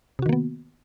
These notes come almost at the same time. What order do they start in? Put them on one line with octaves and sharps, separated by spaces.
C3 F#4 D#3 A#3 B3